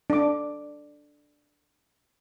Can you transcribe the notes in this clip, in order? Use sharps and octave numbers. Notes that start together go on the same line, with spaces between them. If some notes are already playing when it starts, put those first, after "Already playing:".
D4 D6